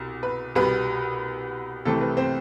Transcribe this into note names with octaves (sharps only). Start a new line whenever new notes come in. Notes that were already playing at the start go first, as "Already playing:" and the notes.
Already playing: C2 B2
B4
C2 B2 G3 B3 B4
C2 C3 E3 A3 C4 A4
B4
C4 C5